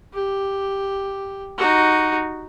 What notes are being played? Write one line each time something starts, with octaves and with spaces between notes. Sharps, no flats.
G4
D#4 F#4